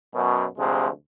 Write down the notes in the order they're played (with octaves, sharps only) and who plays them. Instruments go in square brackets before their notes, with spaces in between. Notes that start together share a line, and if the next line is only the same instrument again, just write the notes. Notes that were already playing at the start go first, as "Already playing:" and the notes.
[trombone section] F#2 B2
D2 C3 F3 G#3